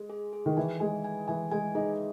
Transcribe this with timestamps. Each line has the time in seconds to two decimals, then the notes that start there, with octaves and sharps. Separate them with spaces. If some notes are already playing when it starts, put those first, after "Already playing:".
Already playing: G#3
0.10 G#4
0.33 G#4
0.46 D#3
0.57 E3 G#5
0.80 G#3 G#5
1.04 G#5
1.28 E3 G#5
1.52 G#3 G#5
1.75 D#4 G#4